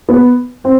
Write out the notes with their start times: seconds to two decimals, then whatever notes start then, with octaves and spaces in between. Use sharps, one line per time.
0.09 B3 B4
0.64 C4 C5